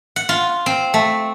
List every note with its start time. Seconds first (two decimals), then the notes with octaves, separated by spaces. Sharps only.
0.16 F#5
0.29 F4
0.66 C4
0.94 A3